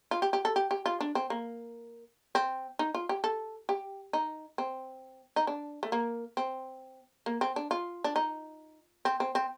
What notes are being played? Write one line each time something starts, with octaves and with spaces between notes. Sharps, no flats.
F4
G4
G4
A4
G4
G4
F4
D4
C4
A#3
C4
D#4
F4
G4
A4
G4
D#4
C4
D#4
D4
A3
A#3
C4
A#3
C4
D4
F4
D4
D#4
C4
C4
C4